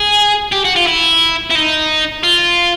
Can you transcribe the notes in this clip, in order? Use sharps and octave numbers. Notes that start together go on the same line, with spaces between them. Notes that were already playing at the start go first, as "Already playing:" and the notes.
Already playing: G#4
G4
F#4
F4
E4
E4
D#4
F4